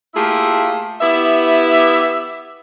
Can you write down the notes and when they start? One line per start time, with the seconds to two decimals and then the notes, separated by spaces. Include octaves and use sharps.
0.15 A3 A#3 E4 F4 G4 G#4
1.00 B3 E4 G4 E5